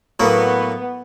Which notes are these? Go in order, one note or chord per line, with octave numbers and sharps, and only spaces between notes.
A2 F#3 A#3 B3